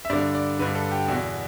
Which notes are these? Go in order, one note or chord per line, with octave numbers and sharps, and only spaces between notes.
E5
G2 D3 D5
D5
G2 D3 B4
A4
G4
E2 B2 F#4